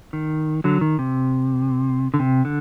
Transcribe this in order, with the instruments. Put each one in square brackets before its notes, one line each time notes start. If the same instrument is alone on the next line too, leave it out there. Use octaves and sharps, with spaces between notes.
[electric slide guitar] D#3
D3 F#3
D#3
C3
D3
C3
D3